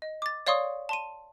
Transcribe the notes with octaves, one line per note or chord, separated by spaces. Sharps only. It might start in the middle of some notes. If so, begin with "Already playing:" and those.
D#5
D6 A6
C#5 D5 F5 C6 C#6 D#6
A5 C6 D#7